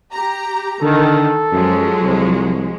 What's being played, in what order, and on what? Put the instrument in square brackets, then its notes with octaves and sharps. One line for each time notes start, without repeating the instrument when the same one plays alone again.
[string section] G4 A#5
[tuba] D3 [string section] D#3 [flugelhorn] A4
[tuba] F#2 [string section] F3 F#3 G#3
[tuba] C2